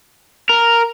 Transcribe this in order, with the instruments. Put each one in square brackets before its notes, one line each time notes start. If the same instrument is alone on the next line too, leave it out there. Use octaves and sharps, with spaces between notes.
[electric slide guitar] A#4